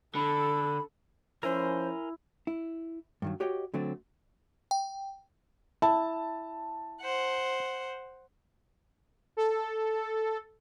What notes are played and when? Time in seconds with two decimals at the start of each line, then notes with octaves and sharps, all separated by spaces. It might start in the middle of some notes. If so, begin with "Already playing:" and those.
0.15 D3 A4 B5
1.43 F3 C#4 E4 A#4 C5 G#5 C6
2.47 E4
3.22 G2 D#3 F#3
3.40 F#4 G4 C#5 D#5 G5
3.74 D3 F#3 A3 C4
4.71 G5
5.82 E4 A5
7.00 C5 F#5
9.37 A4